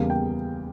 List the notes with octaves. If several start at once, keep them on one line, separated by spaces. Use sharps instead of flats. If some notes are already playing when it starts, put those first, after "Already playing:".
Already playing: E2 C#3 G3 A#3 F5
G5